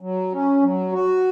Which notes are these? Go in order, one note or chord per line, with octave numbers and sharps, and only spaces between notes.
F#3
C#4
F#3
F#4